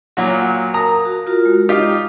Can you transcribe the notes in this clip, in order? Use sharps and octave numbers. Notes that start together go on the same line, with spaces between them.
A#2 F#3 F#4 F5
A#4 A#5 D#6
F#4
F4 F#4 A#4
G#3
D#4 F4 G4